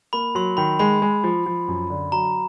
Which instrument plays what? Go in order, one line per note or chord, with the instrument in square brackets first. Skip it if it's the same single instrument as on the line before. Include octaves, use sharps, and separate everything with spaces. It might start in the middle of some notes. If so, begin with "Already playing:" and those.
[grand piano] A#3 [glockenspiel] B5
[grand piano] F#3 [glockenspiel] C6
[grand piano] D#3 [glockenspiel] B5
[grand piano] G#3 [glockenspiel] B5
[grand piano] G#3
F3
F3
F#2
D3
[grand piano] F#3 [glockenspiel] A#5